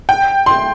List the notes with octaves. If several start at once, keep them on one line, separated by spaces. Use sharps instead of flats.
G5
C6